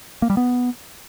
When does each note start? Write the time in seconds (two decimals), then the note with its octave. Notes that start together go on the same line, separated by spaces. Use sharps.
0.22 A#3
0.30 G3
0.37 B3